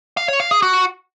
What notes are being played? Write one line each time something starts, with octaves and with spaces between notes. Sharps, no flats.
F5
C#5
F5
G#4
F#4